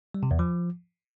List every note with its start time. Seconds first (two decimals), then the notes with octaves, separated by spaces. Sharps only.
0.14 G3
0.23 C3
0.31 E2
0.39 F3